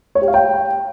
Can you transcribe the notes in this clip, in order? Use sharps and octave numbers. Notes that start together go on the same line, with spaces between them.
C#5
G4
F5
G5